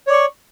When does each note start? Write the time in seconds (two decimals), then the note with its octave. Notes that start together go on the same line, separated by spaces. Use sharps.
0.07 C#5
0.10 D5
0.12 C#6